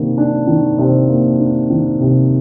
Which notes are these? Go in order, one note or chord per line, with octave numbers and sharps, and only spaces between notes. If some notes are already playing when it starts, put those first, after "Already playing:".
Already playing: C3 D#3 A#3 D4
D4
D#3
C3
A#3
D4
D#3
C3